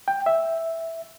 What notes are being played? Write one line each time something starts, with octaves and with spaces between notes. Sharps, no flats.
G5
E5